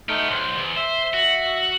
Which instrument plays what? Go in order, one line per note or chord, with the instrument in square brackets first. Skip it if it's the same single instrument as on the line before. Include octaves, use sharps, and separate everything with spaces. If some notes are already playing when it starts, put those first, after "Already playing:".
[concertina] A3 D#4 F6 [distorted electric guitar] B3 G5
[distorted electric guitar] B1 [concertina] C5
[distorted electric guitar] E2
[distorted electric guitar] C5 [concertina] E5
[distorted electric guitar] F#4